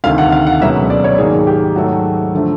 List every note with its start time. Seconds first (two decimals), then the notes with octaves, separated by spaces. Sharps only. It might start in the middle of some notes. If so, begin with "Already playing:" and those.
0.04 D2 C3 D#3 F5
0.18 F#5
0.32 F5
0.47 F#5
0.61 C#2 B2 F#3 A#3 E5
0.90 D5
1.04 C#5
1.18 G#2 D#3 F#3 A#3 G#4
1.47 G4
1.76 G#2 D#3 F#3 A3 F#4
2.35 D3 F3 A3